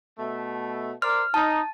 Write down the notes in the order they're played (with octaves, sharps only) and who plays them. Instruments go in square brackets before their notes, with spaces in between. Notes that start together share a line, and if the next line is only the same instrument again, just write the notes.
[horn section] B2 A3
[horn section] A#4 C5 D5 [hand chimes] F6
[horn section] D#4 [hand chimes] A5